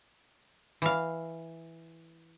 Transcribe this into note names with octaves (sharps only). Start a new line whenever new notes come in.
E3 F5